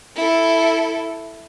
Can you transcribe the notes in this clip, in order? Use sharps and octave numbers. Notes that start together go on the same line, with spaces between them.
E4 A4